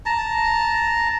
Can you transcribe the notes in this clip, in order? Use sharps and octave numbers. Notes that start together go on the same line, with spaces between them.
A5 A#5